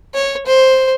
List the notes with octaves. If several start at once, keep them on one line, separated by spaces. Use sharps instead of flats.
C#5
C5